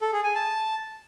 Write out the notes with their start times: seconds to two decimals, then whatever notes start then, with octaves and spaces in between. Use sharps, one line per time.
0.01 A4
0.13 G#4
0.24 G#5
0.35 A5